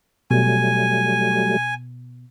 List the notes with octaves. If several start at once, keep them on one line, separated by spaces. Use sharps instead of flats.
B2 F#3 G3 A3 G#5